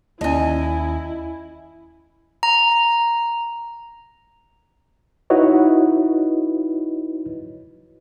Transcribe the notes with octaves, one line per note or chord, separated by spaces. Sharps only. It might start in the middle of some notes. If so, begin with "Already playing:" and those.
D#2 C#4 E4 D#5 G#5 A5
A#5
D#4 E4 F#4 B4 C#5 D#5